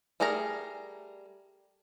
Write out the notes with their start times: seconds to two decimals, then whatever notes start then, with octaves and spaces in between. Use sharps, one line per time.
0.20 G3 A3 G#4 A#4 A#5